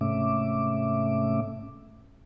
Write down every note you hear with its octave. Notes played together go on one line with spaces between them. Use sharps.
G#2 C3 A3 C#4 E5 D6